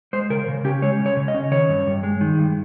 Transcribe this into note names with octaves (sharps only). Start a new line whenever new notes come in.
G#3 C5
C#3 A#4
C#3
C#4 G4
G#3 C#5
C#3
C#5
C#3
D#5
C#4
D#3 C#5
G2
G2
G#3
D#3
G2